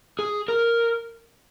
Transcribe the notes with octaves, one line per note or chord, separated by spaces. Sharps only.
G#4
A#4